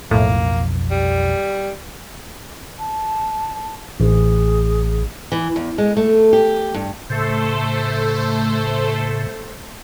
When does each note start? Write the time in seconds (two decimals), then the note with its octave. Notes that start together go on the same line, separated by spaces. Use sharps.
0.11 B1 F2 A2 A#3
0.91 G3
2.79 A5
4.00 A1 G#4
5.32 E3
5.56 E2
5.78 G#3
5.97 A3
6.33 G4
6.74 G2
7.10 A2 C#3 A3 A4 C5